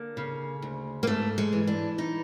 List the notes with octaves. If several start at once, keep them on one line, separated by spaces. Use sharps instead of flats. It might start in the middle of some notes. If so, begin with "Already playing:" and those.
Already playing: D3 A#3
C#3
D2
A#3
G#2 A3
G#3
E3
D4
E3 D#4